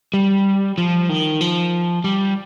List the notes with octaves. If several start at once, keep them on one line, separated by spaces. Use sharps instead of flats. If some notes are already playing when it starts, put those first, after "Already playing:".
G3
F3
D#3
F3
G3